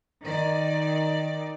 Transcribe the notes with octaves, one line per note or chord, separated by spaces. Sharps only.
D#3 D5